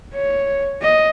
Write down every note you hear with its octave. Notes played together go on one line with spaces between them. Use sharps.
C#5
D#5